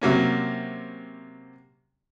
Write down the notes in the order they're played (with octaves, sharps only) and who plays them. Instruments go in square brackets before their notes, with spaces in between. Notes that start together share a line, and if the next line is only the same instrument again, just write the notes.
[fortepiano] C3 F#3 A#3 C#4